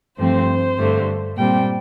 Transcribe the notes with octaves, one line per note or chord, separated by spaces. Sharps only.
G2 F3 A3 C4 C5
G2 D3 A3
A#2 G3 C4 G5